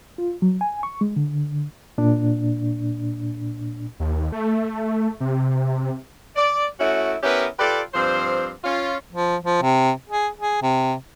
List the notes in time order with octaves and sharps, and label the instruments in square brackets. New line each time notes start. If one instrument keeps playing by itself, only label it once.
[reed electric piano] F4
F#3
G#5
C#6
G#3
D3
A#2 D4
[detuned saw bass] D#2
A3
C3
[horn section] D5
A3 C#4 E4 F#4
B3 C#4 E4 G4 A#4 B4
F4 G4 A4 B4 D5
G2 F3 C4 C5
C#4 F4
[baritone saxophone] F3
F3
C3
G#4
G#4
C3